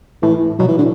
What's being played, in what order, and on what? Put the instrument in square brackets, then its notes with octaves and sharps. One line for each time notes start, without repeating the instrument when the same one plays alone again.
[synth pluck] A2 [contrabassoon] E3
[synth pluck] B2 [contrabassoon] F#3
[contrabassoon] E3
D3